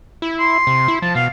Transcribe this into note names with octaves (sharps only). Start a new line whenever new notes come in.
E4
C6
C3
E4
F3 A5
B2 F5